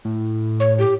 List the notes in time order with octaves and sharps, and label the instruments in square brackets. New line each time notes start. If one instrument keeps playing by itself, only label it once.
[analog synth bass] A2
[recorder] C#5
G4